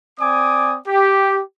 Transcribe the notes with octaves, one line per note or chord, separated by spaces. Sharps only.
C4 D5 G#5 D6 D#6
G4